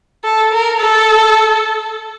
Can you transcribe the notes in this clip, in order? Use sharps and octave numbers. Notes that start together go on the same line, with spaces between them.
A4
A#4
A4